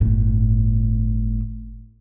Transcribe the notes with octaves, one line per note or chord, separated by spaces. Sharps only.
G1 A2